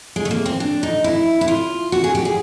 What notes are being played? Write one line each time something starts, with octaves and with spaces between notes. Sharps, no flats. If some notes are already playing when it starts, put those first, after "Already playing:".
G#3
A3
A#3
C4
D4
D#4
E4
E4
F4
F#4
G#4
G4
G#4